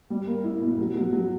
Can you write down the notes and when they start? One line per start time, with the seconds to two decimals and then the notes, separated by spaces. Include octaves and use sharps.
0.10 G3
0.27 A#3
0.44 E4
0.61 B2
0.78 F#3
0.95 F#3
1.13 F#3